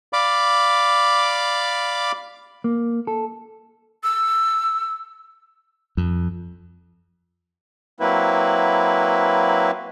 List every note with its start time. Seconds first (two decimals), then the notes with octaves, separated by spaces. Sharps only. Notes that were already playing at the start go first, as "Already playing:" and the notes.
0.13 D5 F5 B5 D6
2.64 A#3
3.07 A4
4.03 E6
5.97 F2
8.00 F#3 A#3 C4 E4 B4